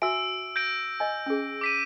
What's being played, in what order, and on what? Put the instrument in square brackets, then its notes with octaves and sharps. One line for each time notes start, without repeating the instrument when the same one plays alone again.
[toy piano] F#4 E5 G#5 [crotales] E6 D7
[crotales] G6 A#6 D7
[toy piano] D#5 G#5
C#4 G#4
[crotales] D6 B6 D#7